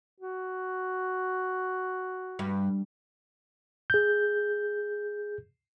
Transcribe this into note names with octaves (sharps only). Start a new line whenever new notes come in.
F#4
G2
G#4 G6